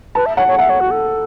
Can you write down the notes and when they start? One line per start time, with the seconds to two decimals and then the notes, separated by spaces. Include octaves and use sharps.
0.15 B4 A5
0.26 E5
0.37 C#5 F#5
0.48 C#5
0.59 E5 F#5
0.69 C#5
0.80 F#4
0.91 A4